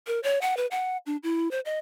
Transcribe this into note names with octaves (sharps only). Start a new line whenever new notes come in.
A#4
C#5
F#5
B4
F#5
D4
E4
C5
D#5